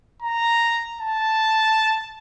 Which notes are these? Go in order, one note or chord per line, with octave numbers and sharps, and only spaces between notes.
A#5
A5